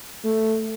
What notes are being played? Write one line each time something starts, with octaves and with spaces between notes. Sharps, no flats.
A3